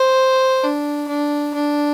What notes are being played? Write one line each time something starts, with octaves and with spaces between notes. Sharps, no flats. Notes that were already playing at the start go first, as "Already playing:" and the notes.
Already playing: C5
D4
D4
D4